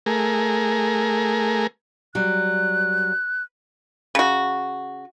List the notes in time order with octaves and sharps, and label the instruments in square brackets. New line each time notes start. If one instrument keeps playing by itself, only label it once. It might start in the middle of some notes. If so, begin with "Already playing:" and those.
[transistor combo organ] A3 G#4 A#4
[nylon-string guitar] F#3 G3 [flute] F#6
[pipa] C#3 F#4